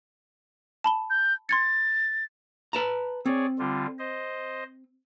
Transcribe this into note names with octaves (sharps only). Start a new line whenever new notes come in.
A5 B5 G7
G6
C6 G#6 A6 C#7
B4 A5 A#5
C4 G#4 C#5 D5
D3 G3 F4
C5 D#5